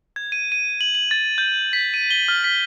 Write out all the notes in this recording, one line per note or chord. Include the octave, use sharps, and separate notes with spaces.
G#6
D#7
D#7
F#7
F#7
A6
G6
B6
D#7
G7
F6
B6